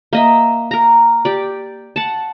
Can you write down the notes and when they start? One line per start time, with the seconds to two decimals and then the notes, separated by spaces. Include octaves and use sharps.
0.13 A#3 D#5 E5
0.71 A#4 A#5
1.25 G4 D5
1.96 F#5 A5